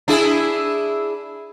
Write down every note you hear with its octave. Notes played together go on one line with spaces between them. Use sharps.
D4 E4 G#4